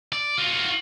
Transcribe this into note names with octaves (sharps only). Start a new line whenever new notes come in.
D5
F4 F#4